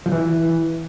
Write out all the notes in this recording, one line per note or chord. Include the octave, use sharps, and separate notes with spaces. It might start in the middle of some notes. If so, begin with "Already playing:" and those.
F3
E3